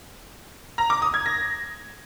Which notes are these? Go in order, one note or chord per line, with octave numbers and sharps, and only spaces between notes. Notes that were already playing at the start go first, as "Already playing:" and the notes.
A#5
D6
D#6
G#6
A#6